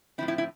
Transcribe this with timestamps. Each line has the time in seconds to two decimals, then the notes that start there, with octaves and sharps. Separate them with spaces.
0.18 A2 F3 C4 E4
0.28 E4
0.38 E4